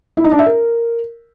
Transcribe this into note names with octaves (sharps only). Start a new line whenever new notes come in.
E4
D#4
D4
E5
A#4